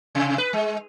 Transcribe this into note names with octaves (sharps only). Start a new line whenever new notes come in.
C3
B4
G#3